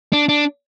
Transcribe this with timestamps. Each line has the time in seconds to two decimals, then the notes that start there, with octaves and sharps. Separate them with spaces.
0.13 D4
0.29 D4